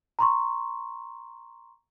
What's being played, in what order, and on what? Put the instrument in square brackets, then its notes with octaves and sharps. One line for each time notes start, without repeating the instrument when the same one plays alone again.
[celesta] A#5 C6 C#6